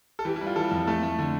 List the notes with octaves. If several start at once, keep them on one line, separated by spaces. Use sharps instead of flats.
A4
E3 G4
E4
G3
F4
E3 A4
F2
A3 A4
A3
D3